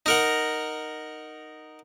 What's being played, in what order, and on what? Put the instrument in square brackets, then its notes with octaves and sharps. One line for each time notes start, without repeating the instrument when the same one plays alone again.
[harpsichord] D#4 A#4 F#5